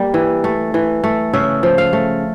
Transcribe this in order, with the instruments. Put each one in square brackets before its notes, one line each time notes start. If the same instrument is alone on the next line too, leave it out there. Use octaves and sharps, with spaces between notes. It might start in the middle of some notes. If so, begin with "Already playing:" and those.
Already playing: [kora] G3 A#3
E3
A3
E3
A3
C#3 E5
F3
F5
A3